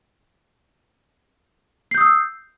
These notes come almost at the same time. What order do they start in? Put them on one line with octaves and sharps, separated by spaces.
C7 G6 D#6 E6